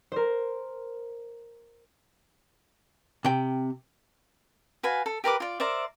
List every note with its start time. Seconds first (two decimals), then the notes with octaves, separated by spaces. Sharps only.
0.12 A#4 C5
3.25 C3 G5
4.83 F#4 B4 F5 G#5
5.06 A4
5.24 G4 A#4 B4 D6
5.40 F4 D5
5.60 A#4 C5 D5 E5